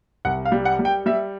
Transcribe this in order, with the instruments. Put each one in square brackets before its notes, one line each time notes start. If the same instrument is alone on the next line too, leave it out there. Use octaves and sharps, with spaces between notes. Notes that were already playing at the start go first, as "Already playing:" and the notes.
[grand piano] C2 F#5
F5
G3
F#5
G3
G5
G3 E5